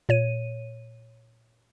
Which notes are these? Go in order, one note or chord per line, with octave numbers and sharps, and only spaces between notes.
A#2 C#5 D#7